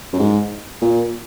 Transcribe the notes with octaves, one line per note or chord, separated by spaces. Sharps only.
F#2
G#2
A#2